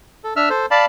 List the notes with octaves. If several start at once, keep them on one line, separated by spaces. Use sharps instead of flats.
A4
D4 E5 E6 F6
A4 C5
D5 F5 A5 B5